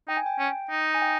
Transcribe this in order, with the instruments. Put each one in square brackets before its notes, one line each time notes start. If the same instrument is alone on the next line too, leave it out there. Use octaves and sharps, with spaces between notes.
[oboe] D#4 [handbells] G5
[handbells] G#5
G5
[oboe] C#4
D#4
[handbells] G#5
G5